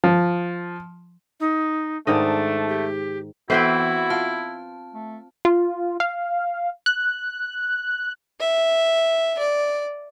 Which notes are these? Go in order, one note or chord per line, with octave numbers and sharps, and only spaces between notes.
F3
D#4
G#2 D#3 A3 D4 D#5
G4
E3 B3 C4 E4 F#4 B4 C5
F4 A5
A3
F4
F5
F#6
E5
D5